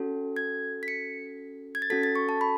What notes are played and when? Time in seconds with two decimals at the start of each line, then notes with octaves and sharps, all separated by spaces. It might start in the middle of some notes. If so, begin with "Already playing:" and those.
Already playing: C#4 F#4 A4
0.36 G#6
0.83 B6
0.88 C#7
1.75 G#6
1.82 A6
1.90 C#4 F#4 A4 B6
2.03 A6
2.15 C#6
2.29 A5
2.41 B5